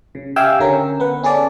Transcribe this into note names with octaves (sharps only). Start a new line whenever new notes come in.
C#3
G4 E5 F5 G5 G#5 E6
D3 C#4 A#4
B3 B4 F#5
C#4 G#4 A4 D5